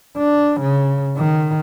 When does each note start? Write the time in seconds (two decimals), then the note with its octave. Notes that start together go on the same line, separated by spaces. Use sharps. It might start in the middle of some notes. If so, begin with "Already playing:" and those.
0.18 D4
0.61 C#3
1.17 D#3